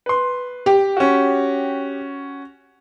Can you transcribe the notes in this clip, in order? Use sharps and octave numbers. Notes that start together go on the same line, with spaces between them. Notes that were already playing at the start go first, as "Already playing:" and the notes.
B4 C6
G4
C#4 F#4